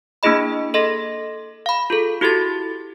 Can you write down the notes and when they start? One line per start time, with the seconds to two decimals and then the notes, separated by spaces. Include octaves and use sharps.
0.23 A#3 D4 E4 G#4 D#5 B5
0.74 A4 D#5 C6 A#6
1.66 F5 B5
1.90 F4 G#4 A4
2.21 E4 F#4 G4 A4 A6